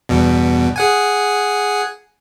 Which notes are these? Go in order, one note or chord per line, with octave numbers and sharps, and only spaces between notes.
E2 G2 B2
G#4 F#5 G#5